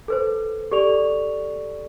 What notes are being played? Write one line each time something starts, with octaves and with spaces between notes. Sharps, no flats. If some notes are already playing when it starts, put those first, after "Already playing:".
A4 B4 C5
G4 A4 D5 C#6 F7